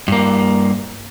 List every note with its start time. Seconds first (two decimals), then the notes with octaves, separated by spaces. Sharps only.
0.08 G2 A#3